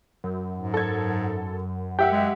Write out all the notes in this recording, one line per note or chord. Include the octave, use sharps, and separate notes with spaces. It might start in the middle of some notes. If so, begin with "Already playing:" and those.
F#2
G#2
A4 G#6
G4 E5 F#5 G5
G#3